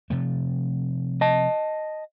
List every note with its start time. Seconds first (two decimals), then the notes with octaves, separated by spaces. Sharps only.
0.10 C3 F3 A3
1.21 D#5 A5